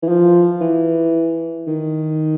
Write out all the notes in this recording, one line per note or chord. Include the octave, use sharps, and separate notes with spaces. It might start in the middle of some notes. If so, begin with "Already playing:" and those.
E3
F3
E3
D#3